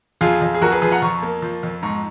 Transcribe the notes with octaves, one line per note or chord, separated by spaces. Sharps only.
F2 F4 G#4
F2
G#4
F2 F#4 A#4
G#4 B4
F3 G#4 B4
F#5 A#5
F2 A#5 C#6
A#3
F3
F2
G#2 A#5 C#6